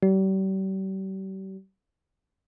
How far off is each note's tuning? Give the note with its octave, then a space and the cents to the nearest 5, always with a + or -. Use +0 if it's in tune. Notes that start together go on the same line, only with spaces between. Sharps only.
G3 -40